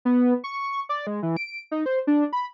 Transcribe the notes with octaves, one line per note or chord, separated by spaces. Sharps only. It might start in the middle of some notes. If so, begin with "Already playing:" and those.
B3
C#6
D5
G#3
E3
D7
D#4
C5
D4
B5